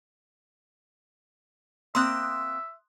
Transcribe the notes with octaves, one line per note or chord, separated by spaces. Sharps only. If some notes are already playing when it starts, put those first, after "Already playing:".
A#3 C4 E5 C6 D#6 F#6